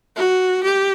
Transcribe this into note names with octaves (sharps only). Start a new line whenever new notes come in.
F#4
G4